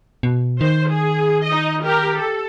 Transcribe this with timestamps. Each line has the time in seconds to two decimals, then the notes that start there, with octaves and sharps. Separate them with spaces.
0.23 B2
0.61 D#3 C5
0.90 G#4
1.46 D#4 D#5
1.85 G4 A#4
2.18 A4